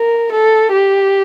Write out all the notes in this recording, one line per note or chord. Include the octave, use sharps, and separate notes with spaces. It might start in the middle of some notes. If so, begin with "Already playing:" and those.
Already playing: A#4
A4
G4